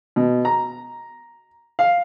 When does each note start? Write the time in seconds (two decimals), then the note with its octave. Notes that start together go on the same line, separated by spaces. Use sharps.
0.16 B2
0.45 A#5
1.79 F5